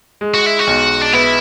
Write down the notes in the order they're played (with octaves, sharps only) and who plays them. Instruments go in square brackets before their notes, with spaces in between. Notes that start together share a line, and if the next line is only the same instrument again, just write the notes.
[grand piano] G#3
[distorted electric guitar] F#4
E4
F#4
[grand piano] B1
[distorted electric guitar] D4
[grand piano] B3 [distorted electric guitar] E4